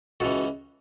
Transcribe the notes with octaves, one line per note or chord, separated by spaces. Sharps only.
C#2 C#3 E3 F#4 A4